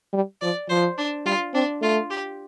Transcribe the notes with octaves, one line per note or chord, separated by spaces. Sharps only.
G3
F3 D5
F3 C5
D4
G3 F4
C4 D4
A3 F4
G4